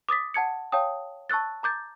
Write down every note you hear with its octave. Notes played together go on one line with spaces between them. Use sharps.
D6 D#6 A6 B6
F#5 A5 G#6 C#7
C#5 F5 G5 A5 D#6
A5 C#6 E6 F#6 A6
A#5 D6 G6 A6